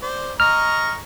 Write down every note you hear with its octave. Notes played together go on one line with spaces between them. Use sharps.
C5 D5
D#5 A#5 C#6 F6